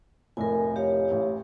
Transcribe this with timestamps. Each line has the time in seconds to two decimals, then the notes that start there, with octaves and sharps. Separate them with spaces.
0.37 F1 A2 A#4 G#5
0.76 G4 C#5 F5
1.11 A1